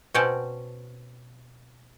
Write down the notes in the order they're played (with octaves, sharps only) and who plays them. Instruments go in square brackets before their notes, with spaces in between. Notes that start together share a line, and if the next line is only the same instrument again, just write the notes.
[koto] B2 C4 C#4 F#5 G5 A5